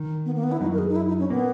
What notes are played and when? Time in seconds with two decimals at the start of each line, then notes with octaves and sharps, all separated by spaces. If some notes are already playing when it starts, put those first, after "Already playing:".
Already playing: D#3
0.26 B3
0.35 A#3
0.44 B3
0.52 E4
0.61 F#2 F#3 D#4
0.73 A#4
0.78 G#4
0.89 D#4
0.96 E4
1.08 D#4
1.20 C#4
1.30 A#2 A#3 B3